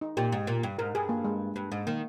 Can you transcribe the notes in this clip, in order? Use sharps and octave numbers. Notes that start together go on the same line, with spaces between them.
D#4
A#2 G4
G#2
A#2
G2
G#2 A#4
G2 G#4
A#3
G#3
G2
G#2
D#3 A#3